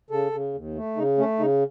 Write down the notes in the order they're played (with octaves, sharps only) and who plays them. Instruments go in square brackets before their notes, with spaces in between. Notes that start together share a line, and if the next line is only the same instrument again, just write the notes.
[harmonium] C#3 A4
C#3
D#2
A3
C#3 D#4
A3 C#4
C#3 D#4